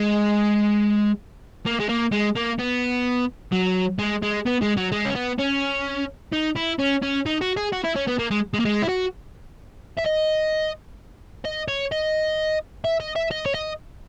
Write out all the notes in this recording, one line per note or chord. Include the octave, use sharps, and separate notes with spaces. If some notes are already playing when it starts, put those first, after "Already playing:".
Already playing: G#3
A#3
G#3
A#3
G#3
A#3
B3
F#3
G#3
G#3
B3
G#3
F#3
G#3
C#4
B3
C#4
D#4
E4
C#4
C#4
D#4
F#4
G#4
F#4
E4
C#4
B3
A#3
G#3
G#3
A#3
G#3
E4
F#4
E5
D#5
D#5
C#5
D#5
E5
D#5
E5
D#5
C#5
D#5